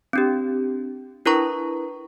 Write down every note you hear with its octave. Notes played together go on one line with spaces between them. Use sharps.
C4 D4 G4
D4 E4 A#4 B4 A#5 C#6